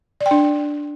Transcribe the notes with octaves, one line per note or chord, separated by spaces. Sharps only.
D5
G5
D4